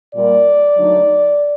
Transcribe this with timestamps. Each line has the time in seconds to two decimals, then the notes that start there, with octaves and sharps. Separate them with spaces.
0.13 A#2 G3 A#3 D5
0.76 D3 F#3 A3 D#4